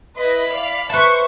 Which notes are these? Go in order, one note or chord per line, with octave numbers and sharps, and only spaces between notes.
E4 B4 D#5 B5
D5 F5
B4 C5 E5 A5 C#6